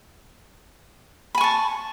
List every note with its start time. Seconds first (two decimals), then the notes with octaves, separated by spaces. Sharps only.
1.35 B5
1.38 G#5
1.41 C#6
1.44 A5